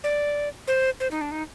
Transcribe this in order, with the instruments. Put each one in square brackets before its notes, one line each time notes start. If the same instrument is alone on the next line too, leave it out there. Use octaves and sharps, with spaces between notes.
[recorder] D5
C5
C5
D#4
D4
D#4